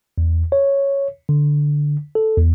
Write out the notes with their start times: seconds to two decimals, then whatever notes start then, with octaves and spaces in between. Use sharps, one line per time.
0.18 E2
0.52 C#5
1.29 D3
2.15 A4
2.38 E2